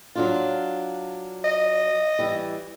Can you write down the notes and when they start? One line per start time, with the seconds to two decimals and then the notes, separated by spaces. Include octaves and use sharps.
0.16 F#3 D4 F4
1.45 D#5
2.19 E3 G3